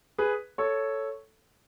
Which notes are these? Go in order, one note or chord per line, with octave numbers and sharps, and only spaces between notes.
G#4 B4
A4 C#5